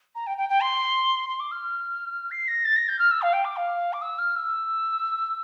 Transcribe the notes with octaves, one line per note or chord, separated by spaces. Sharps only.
A#5
G5
G5
G5
C6
C6
D6
F6
C7
A#6
A6
A#6
G6
F6
E6
F5
G5
D6
F5
D6
E6
F6
E6